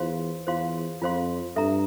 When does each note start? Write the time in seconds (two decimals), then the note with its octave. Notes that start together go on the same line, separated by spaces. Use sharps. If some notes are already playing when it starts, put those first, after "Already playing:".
Already playing: E2 F4 C5 F5 C6
0.47 E2 F4 C5 F5 C6
1.02 F2 F4 C5 F5 C6
1.56 G2 A4 E5 A#5